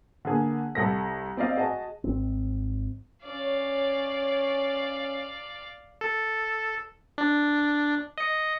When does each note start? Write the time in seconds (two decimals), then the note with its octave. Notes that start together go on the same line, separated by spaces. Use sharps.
0.25 D3 A#3 G#4
0.75 C2 A4 A#6
1.37 C4 D5 D#5 F5
1.56 F#4 G#4 D#5 A5
2.04 G#1 C4
3.25 C#4 C#5 D5 F5
6.01 A4
7.18 D4
8.18 D#5 C#7